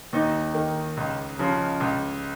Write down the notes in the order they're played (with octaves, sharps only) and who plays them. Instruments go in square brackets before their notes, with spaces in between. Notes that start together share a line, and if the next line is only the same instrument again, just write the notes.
[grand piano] D#2 D#4
D#3
C#2
C#3 F3
C#2